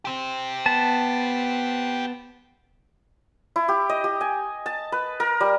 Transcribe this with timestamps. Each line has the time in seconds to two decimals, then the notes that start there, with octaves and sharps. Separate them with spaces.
0.05 G4 C5
0.66 B3 A5
3.56 E4
3.68 G4
3.89 D#5
4.04 G4
4.21 G#5
4.66 A5
4.92 B4
5.20 A#4
5.41 G3